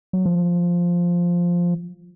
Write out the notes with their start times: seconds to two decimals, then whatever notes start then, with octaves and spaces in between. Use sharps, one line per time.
0.13 F#3
0.26 F3